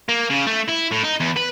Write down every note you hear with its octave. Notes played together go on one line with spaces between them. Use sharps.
A#3
C#3
A3
E4
A2
D#4
E2
B4